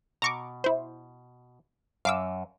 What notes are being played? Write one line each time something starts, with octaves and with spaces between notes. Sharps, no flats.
B2 A#5 C#6 D6
E4 C5
F#2 F5 D6 E6